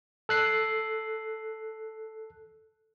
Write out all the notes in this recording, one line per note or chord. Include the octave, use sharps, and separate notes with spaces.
A4 F#6 C7